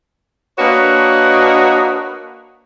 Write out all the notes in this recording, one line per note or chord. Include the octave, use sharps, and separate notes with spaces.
A#3 D4 F#4 B4 C#5 D#5